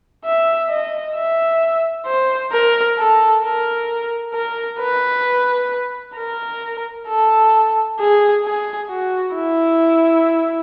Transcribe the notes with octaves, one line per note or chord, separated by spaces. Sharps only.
E5
D#5
E5
C5
A#4
A4
A#4
A#4
B4
A#4
A4
G#4
G#4
F#4
E4